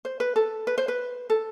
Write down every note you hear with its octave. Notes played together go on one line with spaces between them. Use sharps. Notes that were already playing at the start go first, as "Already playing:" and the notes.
C5
B4
A4
B4
C5
B4
A4